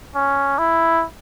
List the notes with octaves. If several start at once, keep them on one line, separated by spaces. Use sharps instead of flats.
C#4
E4